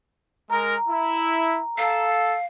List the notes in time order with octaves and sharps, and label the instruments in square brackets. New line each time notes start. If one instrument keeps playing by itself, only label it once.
[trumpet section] G#3 A#4 [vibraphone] A#5
[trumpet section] E4
[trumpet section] A4 [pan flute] F5